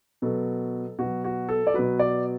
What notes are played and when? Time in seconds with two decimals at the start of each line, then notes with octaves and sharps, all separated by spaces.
0.22 B2 F#3 A4
0.99 B2 F#3 F#4
1.24 F#4
1.49 A4
1.67 D5
1.74 B2 F#3 B4
1.99 D5